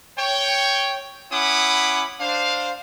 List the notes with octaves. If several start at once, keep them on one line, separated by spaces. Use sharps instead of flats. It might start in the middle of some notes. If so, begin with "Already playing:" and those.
C#5 G5
C#4 E4 F#5 B5 D6 D#6
D4 C5 F5